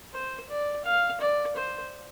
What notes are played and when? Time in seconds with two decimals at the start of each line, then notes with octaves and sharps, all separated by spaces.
0.14 C5
0.50 D5
0.85 F5
1.21 D5
1.56 C5